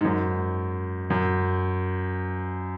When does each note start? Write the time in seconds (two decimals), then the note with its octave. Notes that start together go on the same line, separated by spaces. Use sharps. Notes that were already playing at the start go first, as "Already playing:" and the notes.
0.01 G#2
0.05 F#2
1.10 F#2